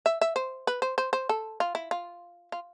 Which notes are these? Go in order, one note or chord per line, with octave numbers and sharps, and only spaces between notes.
E5
E5
C5
B4
C5
C5
C5
A4
F4
E4
F4
F4